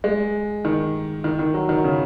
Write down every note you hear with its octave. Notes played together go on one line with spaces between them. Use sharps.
G#3
D#3
D#3
D#3
F#3
D#3
C#3